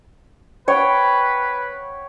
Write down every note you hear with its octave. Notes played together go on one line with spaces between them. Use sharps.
B4 C#5 F#5 G5